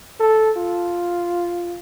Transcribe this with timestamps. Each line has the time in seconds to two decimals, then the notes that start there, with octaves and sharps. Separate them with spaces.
0.20 A4
0.57 F4